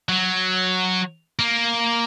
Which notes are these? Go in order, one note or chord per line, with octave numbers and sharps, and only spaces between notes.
F#3
A#3